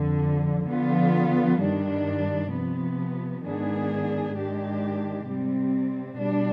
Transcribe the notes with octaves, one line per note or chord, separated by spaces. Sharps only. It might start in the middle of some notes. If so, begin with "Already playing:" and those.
Already playing: F2 D3 F3
D3 F3 B3 F4
G2 D#3 G3 D4
C3 F3 B3
G#2 D#3 B3 D4 G#4
G#2 D#3 G#3 D4 G4
C3 G3 C4
B2 G3 D4